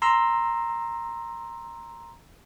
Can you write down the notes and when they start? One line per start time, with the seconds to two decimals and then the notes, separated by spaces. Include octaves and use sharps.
0.02 A#5 C6 E6